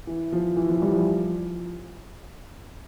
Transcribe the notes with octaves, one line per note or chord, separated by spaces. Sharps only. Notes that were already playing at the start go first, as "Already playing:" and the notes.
E3
F3
E3
F3
E3 G3
F3